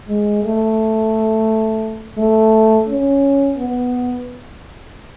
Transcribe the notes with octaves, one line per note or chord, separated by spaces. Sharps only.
G#3
A3
A3
C#4
B3